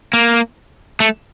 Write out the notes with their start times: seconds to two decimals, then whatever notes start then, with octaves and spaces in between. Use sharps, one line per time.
0.13 A#3
1.00 A3